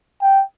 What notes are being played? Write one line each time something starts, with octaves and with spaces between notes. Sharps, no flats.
G5